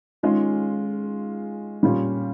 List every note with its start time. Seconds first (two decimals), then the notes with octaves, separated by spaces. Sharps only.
0.23 D#3 G#3 C#4 F4
1.83 A#2 G3 C#4 F4